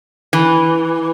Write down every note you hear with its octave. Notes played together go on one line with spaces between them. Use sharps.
E3